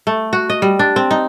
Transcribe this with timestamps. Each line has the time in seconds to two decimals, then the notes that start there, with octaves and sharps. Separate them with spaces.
0.07 A3
0.33 F#4
0.50 D#5
0.62 G3
0.79 D4
0.96 C4
1.11 D#4